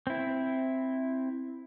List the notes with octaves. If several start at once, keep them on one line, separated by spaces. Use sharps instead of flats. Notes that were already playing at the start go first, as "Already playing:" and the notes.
C4 E4